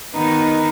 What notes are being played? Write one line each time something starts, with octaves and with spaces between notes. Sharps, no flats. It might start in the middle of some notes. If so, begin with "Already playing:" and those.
D#3 B3 D#4